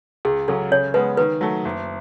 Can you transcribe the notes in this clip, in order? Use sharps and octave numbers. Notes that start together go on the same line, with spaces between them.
C#2 G#4
C#3 F#3 C#4 A4
C#3 C#5
G#3 B3 B4
D#3 B4
F#3 A3
F#1